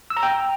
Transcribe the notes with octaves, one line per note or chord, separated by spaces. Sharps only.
E6
A#5
G5